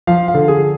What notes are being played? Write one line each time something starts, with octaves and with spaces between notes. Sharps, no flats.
F3 F5
F5
D3
G#4